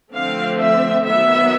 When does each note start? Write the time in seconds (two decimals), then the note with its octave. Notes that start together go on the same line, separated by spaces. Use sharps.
0.13 D3 F3 A3 C4 F5
0.61 E5
1.07 D#3 F#3 B3 E5